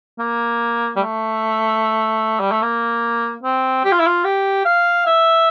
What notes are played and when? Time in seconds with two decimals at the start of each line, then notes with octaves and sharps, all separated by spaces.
0.19 A#3
0.96 G3
0.99 A3
2.40 G3
2.51 A3
2.62 A#3
3.43 C4
3.85 G4
3.92 F4
4.00 E4
4.06 F4
4.24 G4
4.65 F5
5.06 E5